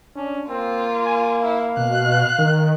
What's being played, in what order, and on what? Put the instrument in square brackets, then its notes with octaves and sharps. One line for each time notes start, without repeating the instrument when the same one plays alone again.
[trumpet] C#4 [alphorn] D4
[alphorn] A#3 [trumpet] C4 [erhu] F4
[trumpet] G#5
[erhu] E4 [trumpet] F5
[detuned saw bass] B2 [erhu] F#6
[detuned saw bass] D#3